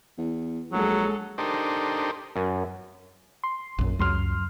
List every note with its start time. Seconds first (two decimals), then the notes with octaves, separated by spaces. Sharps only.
0.18 E2
0.72 A#1 F#3 G#3 A4
1.38 D4 D#4 G4 A4 A#4 C5
2.36 F#2
3.44 C6
3.78 A#1 F#2
3.99 C#2 F#2 F#3 C6 F6